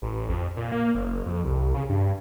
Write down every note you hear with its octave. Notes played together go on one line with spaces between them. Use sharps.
A1
F2
A#2
A#3
F#1
F2
C2
C#3
G2